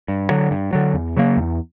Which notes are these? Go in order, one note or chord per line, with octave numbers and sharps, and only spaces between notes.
G2
D3 F#3
G2
D3 F#3
E2
C#3 F#3 A#3
E2